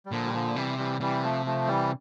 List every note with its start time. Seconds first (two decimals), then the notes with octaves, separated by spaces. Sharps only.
0.06 G3
0.11 A#2 D3 F3
0.26 G3
0.34 D3 F3
0.56 C3 E3 G3
0.78 E3 G3
1.01 C3 E3 G3
1.23 F3 A3
1.46 F3 A3
1.68 E3 G3